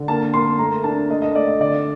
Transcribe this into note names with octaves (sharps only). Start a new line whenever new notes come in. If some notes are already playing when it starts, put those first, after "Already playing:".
Already playing: D3
A#3 A5
A#3 C6
A3 A#5
D4 A5
A3 D#5
D#5
A3 D5
D#5
D3 D5